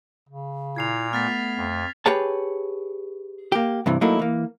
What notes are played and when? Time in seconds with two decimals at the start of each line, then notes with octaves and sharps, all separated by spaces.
0.29 C#3
0.76 A#2 E4 G#6 C7 F7
1.13 A3 B3 F6 A6 B6
1.57 F2
2.06 G4 G#4 B4 C#5 A5
3.52 A#3 G4
3.86 G2 C3 E3
4.01 F#3 A3 A#3 D#4 E4
4.19 E3 A#3